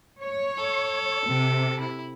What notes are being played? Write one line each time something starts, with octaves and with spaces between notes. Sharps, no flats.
C#5
A4
C3
E4